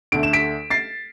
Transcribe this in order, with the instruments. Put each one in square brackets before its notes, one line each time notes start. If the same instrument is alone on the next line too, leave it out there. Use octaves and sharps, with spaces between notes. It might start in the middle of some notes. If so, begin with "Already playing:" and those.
[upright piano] D2 D3 A3 D7
E7
B6 D7
A6 C7